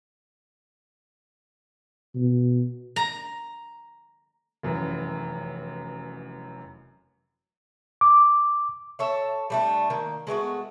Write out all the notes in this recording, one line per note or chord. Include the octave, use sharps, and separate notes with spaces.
B2
A#5
F1 F#2 E3
D6
A4 C#5 E5
G3 A3 D4
D#3 A#3
G#3 A3 B3 F#4